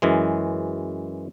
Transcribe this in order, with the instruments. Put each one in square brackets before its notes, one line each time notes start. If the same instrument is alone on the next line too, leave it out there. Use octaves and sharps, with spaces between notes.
[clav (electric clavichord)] F#2 E3 G#3